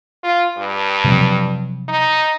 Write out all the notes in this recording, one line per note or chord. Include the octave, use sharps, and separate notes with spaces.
F4
G2
C3 F3 F#3
D#4